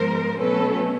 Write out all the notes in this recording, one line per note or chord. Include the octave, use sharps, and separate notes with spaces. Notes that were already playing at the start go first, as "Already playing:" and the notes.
Already playing: G#2 F3 G#3 B3 A#4 C5
B2 F#3 A3 C#4 A4 B4